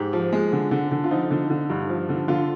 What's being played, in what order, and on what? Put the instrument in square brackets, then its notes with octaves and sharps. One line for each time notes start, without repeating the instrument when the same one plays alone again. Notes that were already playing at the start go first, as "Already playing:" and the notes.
Already playing: [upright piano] G#2 G4
F3
G#3
D3
D3
D3
F4
F3 D#4
D3
D3
G2
F3
D3
D3 F4